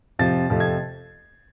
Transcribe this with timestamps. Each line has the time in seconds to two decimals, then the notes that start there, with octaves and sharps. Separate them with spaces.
0.19 F2 C3 F3 A6
0.50 F2 C3 F3 A3
0.60 G#6